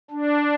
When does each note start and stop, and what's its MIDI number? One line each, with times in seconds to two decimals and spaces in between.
0.11 0.55 62